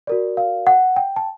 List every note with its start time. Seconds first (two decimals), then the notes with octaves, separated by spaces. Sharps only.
0.07 F#4 A#4 D5
0.37 F5
0.67 F#5
0.96 G5
1.16 A5